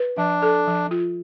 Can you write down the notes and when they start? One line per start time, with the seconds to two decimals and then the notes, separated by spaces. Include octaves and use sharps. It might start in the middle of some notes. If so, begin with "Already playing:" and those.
Already playing: B4
0.18 F3 D4
0.42 A4
0.67 F3
0.91 F4